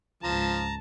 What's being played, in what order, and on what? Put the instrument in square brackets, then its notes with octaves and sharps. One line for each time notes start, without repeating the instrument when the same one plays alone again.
[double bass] C#2 G#2 [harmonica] F3 [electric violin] A5 [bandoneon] A#5